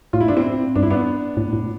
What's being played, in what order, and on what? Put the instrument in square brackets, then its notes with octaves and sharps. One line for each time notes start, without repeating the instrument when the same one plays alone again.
[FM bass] A2 [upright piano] F4
[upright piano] E4
D4
C4 E4
[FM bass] G2 [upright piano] D4
[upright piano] E4
B3 D4
[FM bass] A2
A2